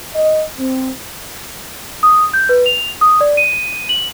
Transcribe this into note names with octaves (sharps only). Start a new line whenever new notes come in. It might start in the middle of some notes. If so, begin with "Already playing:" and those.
D#5
C4
D#6
G6
B4
F7
D#6
D5
D#7
F#7